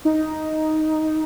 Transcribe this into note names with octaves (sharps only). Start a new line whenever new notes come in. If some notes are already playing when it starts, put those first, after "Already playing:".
D#4